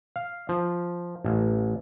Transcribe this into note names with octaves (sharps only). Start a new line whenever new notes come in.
F5
F3
A1